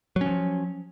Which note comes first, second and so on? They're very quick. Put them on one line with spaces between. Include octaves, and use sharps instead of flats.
F#3 C#4 F3